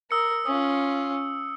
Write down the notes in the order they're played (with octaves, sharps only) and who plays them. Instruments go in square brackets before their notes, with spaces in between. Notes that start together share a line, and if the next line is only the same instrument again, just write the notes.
[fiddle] A#4 [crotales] D#6 E6 C#7
[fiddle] C#4 F4 [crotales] D#6